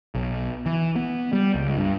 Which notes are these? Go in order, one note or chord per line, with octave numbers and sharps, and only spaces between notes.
B1
E3
B3
G3
C#2
G2